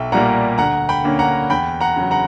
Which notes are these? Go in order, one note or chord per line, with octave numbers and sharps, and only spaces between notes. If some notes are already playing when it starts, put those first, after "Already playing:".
Already playing: B1 E5 G5
A#2 G3 A#3 F#5 A#5
D2 F#5 A#5
G5 B5
D3 A#3 C#4
F#5 A#5
E2 G5 B5
F#5 A#5
C#3 F#3
F#5 A#5